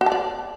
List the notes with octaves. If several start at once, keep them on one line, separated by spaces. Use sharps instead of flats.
F#4
A5
D5